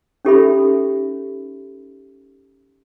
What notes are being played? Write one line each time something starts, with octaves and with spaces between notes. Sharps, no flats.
C#4 D#4 G4 A4 E5 B5